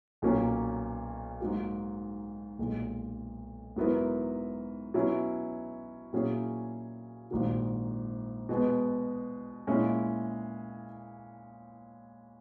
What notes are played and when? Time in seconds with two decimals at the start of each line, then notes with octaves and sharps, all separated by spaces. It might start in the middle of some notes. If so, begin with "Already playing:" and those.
0.22 B1 A#2 F#3 A#3 C#4
1.40 G#2 F#3 A#3
2.59 B1 A#2 G#3
3.76 G#2 F#3 B3 E4 A#4
4.94 B2 F#3 C#4 E4
6.13 A#2 F#3 C#4 E4 G#4
7.31 A#1 G#2 D#3 F#3
8.49 B2 G#3 B3
9.67 A#2 G#3 C#4 E4